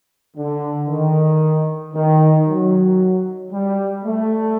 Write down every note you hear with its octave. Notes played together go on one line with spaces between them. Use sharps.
D3
D#3
D#3
F#3
G3
A3